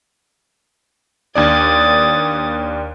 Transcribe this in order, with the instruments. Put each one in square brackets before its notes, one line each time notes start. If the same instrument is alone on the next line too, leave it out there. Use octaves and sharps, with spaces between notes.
[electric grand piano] D#2 D4 D5 [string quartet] D#6 G#6 A6